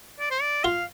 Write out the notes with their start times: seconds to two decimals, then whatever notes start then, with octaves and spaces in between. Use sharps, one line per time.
0.20 D5
0.31 C5
0.42 D5
0.64 F4 F5